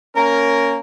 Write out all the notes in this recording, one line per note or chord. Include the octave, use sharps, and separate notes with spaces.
A#3 C#4 A#4